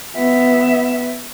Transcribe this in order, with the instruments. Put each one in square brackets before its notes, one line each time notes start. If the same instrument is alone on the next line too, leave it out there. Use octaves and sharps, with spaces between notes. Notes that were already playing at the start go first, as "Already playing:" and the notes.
[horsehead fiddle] B3 E5